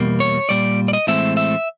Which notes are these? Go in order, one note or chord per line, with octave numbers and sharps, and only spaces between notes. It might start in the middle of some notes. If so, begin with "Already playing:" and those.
Already playing: E2 B2 G3 A#3
C#5
A#2 G3 D5
D5
D#5
A2 E3 G#3 C4 E5
E5